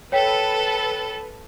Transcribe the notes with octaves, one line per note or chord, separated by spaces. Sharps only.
A4 B4 C#5 G5 B6